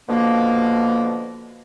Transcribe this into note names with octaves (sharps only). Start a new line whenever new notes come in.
B2 D3 F3 A#3